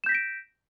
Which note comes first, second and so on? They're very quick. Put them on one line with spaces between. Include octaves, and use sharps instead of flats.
E7 G6 B6 A#6 D7